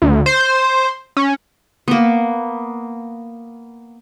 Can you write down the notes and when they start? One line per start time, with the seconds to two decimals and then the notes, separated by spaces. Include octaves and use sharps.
0.02 D2
0.26 C5
1.17 C#4
1.88 A#3 B3